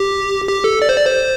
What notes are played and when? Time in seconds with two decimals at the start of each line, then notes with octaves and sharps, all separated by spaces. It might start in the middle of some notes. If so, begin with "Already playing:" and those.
Already playing: G4
0.48 G4
0.64 A4
0.82 D5
0.89 C5
0.97 D5
1.06 C5